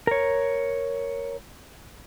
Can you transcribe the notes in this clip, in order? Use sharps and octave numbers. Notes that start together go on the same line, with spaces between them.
A#4 C#5